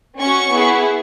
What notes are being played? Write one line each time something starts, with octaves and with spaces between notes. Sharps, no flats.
C#4 F#4 C#6
B3 E4 G#4